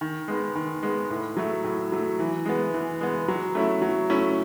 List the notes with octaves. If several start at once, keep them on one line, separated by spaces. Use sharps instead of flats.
D#3
G#3 B3
D#3
G#3 B3
A2
F#3 A3
A2
F#3 A3
E3
G#3 B3
E3
G#3 B3
F#3
A3 C#4 E4
F#3
A3 C#4 E4